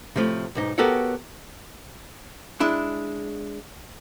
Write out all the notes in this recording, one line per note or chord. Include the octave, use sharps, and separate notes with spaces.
A2 C3 F3 A3
B1 G#2 D#4
B3 F#4 G4 A4 A#4 C#5
G#3 D4 E4